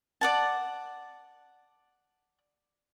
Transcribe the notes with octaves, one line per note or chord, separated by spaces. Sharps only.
D5 F#5 A5